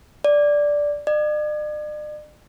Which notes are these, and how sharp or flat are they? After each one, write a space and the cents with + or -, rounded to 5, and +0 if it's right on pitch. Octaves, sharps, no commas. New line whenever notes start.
D5 -5
D5 +45